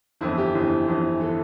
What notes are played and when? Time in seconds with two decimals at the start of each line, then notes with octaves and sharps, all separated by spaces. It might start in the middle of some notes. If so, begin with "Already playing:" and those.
0.21 G1 F2 E3 E4
0.38 G4
0.54 G1 F2 E3
0.87 G1 F2 E3
1.20 E3 A4